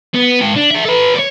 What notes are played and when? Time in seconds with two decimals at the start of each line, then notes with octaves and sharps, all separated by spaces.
0.14 B3
0.41 G#2 G5
0.56 D4
0.71 G#4 E5
0.86 A4 B4
1.16 C#5 D5